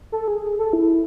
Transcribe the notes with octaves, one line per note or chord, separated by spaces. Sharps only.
A4
G#4
A4
E4